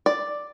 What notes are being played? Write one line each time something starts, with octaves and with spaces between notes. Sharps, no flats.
D5